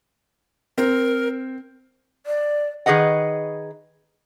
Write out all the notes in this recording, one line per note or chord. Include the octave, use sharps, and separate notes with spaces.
C4 A#4
D5
D#3 G#4 B4 D#5 F#5